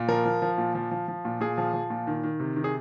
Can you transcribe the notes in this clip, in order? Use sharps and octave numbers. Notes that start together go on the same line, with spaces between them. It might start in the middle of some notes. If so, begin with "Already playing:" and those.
Already playing: A#2
F3 A#4
F3
F3
A#2
F3
F3
F3
A#2
A#2 G#4
F3
F3
A#2
D#3
D#3
C3
D#3
G#4